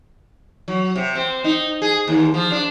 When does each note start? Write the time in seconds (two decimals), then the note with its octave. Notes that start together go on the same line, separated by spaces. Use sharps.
0.68 F#3
0.96 C3
1.15 C4
1.44 D#4
1.82 G#4
2.08 D#2
2.34 F3
2.52 D4